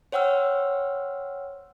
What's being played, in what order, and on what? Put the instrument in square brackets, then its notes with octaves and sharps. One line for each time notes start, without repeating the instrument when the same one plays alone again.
[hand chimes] C5 C#5 F#5 G5 E6 F6